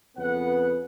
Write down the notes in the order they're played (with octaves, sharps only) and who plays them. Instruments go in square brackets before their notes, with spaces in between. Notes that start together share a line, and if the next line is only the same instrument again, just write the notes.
[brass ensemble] F2 C#3 B3 B4 F#5